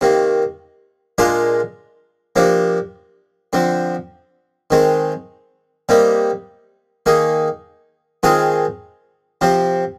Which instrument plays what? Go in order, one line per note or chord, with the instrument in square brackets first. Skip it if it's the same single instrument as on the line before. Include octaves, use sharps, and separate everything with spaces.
[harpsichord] C3 D#3 A#3
A#2 G#3 D4 F4 A#4
C3 F3 A#3 D4
D3 F3 C4
D#3 G#3 C4
C3 G3 A#3 D#4
D#3 A#3 D#4 G#4
D#3 G#3 C4 F4 G#4
C3 F3 C4